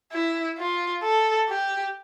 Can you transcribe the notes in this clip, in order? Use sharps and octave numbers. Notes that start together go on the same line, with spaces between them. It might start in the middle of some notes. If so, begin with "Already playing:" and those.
E4
F4
A4
G4